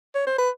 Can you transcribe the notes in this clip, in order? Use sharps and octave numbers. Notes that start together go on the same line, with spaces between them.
C#5
C5
B4